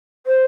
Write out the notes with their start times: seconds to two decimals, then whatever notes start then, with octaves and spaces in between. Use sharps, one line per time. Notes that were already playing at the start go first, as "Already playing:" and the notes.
0.26 C5